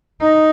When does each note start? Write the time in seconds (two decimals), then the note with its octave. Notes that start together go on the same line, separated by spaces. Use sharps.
0.21 D#4